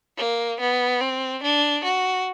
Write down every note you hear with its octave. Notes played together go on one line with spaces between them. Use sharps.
A#3
B3
C4
D4
F#4